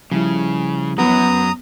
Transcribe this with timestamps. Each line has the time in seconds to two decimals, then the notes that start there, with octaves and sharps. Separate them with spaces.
0.11 C#3 F3 G3 E4
0.98 F#2 F#3 B3 A#5 D#6